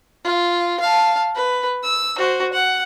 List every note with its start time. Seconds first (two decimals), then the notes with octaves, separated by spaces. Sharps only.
0.24 F4
0.80 F5 A5
1.35 B4
1.83 E6
2.18 F#4 C5
2.53 F#5